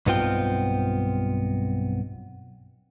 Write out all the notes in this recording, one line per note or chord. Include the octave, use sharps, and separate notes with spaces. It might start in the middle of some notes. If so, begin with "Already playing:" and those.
B1 G2 B3 C4 F4 G5